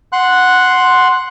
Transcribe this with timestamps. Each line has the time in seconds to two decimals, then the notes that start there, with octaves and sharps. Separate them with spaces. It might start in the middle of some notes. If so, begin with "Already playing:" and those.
0.13 F#5 C6 F#6